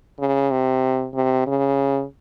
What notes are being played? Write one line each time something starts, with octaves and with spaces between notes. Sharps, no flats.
C#3
C3
C3
C#3